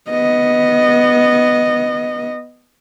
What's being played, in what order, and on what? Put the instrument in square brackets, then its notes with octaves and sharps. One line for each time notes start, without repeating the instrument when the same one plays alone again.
[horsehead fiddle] B3 D#5